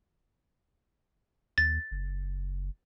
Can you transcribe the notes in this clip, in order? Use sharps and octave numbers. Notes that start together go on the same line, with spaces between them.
D#2 A6
F#1